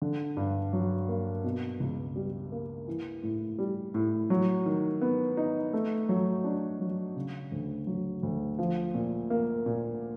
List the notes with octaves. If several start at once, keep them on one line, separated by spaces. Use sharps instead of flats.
D3
G2
F#3
A#3
B2
C#2
G3
A#3
E3
A2
G3
A2
F#3
D#3
B3
D#4
A3
F#3
D4
F#3
C#3
D2
F#3
D2
F3
A#2
A#3
A#2